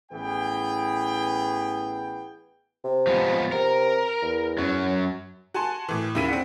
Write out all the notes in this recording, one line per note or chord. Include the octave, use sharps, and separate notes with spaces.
A1 E3 B3 G#4 G5
C3
F3 G#3 B3
C3 A#4
E2
F#2 F#3
F#4 G#5 A5 C6
A2 E3
D#2 C#3 E4 B6 D#7
C4 D4 F#5